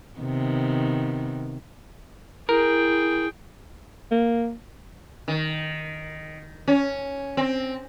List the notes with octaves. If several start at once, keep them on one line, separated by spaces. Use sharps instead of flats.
C3 D#3 B3
E4 G#4 A#4 G5
A#3
D#3
C#4
C4